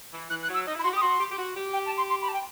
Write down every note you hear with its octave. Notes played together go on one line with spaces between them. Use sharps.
E3
E3 F#6
F#6
F#3
E6
D#4
E4
B5
F#4 C6
G4 D#6
F#4 C6
G4
G4
F#4
G4
G5
A5
C6
C6
B5
A5
G5